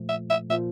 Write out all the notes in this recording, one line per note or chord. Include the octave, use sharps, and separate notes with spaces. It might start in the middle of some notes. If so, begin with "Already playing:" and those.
Already playing: A#2 F3 A3
E5
E5
A#2 F3 A#3 F4 E5